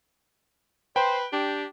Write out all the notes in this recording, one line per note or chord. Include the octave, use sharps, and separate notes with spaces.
B4 C5 G5
D4 G4